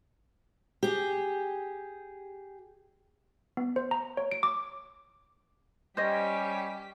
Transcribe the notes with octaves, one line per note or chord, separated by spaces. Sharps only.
G4 G#4
B3
C5
A#5
C#5
D7
D6
G3 C#4 G4 C5 D#5 B6